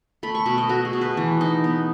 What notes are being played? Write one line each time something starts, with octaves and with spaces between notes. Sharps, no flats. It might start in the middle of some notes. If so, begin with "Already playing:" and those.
A3 B5
C#6
B2 B5
D#5
A3 F#4
G#4
B2
B4
E3
D#4
B3